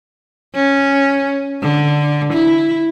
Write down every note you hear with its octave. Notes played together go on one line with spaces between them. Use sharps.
C#4
D3
E4